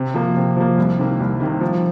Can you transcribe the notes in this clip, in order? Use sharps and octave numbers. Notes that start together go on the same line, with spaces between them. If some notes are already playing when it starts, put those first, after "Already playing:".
Already playing: C3
F3 A#3
C3
F3 A#3
C2
C3 D#3 A#3
C2
C3 D#3 A#3
F3